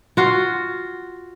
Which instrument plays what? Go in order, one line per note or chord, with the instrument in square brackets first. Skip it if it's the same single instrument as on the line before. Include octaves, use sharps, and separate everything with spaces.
[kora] F4 F#4